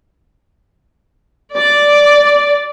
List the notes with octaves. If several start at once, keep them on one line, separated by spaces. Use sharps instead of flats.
D5